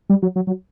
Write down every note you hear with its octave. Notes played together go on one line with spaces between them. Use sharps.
G3
F#3
F#3
F#3